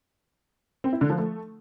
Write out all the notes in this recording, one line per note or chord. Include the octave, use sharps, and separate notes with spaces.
C4
E4
D3
F3
A3